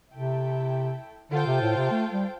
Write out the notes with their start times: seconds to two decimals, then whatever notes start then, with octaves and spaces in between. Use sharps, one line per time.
0.13 C3 A3 E4 A4 E5 G5
1.32 D3 F4 A4 C5 G5
1.47 C3
1.61 A2
1.77 C3
1.91 A3
2.11 G3